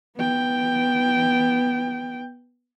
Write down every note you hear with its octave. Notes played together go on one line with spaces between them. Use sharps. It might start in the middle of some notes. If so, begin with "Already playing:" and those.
B3 G5